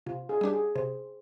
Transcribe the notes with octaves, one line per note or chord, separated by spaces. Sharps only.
C3 F4
G#4
G3 D4 G4
G#4
C3 C5